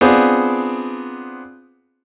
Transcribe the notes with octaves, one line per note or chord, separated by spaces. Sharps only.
B3 C4 D4 F4 G#4 C5